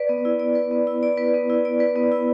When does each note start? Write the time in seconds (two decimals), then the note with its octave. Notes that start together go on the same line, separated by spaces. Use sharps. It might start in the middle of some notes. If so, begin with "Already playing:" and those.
Already playing: B4 D5
0.09 B3
0.25 E4
0.40 D5
0.55 B4
0.71 B3
0.87 E4
1.03 D5
1.18 B4
1.34 B3
1.50 E4
1.65 D5
1.80 B4
1.96 B3
2.12 E4